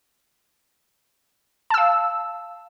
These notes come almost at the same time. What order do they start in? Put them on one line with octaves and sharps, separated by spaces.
A5 E6 F5